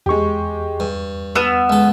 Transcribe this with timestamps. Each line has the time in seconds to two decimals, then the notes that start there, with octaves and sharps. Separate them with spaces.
0.06 E2 G#3 G4 C#6
0.80 G2
1.35 B3 E6 F6 E7
1.70 C#2 A4